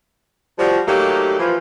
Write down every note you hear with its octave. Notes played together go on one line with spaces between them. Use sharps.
F3 G3 F#4
F#3 G3 A3 A#3 D#4 G4
E3 F3 F4